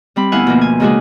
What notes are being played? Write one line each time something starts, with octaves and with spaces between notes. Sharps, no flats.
G3 C4 B5
D2 B3 E4 F5 F#5 G#5
B2 F3 A#3
G#5
C#3 G#3 A#3 D4 F#4 G#4